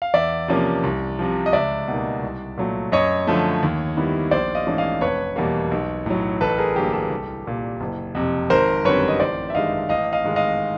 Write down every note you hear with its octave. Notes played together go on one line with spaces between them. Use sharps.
F5
E2 D5 E5
C3 F3 A#3 C#4
C2
C3 F3
D#5
C#2 D5 E5
B2 G3 A#3 D#4
C2
A#2 F#3 A3
F#2 C#5 D#5
D3 F3 A3
D#2
D#3 G3 B3 E4
A#1 C5 D5
D#5 F5
G#2 E3 A3 C#4
D#5 F5
F1 B4 C#5
E2 B2 G3 A#3
B1
A2 F#3
A1 A4 B4
G#4 A#4
G2 D3 F#3 A#3 G4 A4
G4 A4
C2
A#2 G3
F#1
F2 C3
G#1 A#4 C5
F#2 D3 G3 C4 B4 C#5
D#5
A1 C5 D5
E5
G2 D#3 G#3 D#5 F5
A1 D#5 F5
D#5 F5
G#2 D#3 G#3
D#5 F5